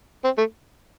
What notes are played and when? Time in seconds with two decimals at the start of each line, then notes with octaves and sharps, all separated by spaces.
0.24 C4
0.38 A3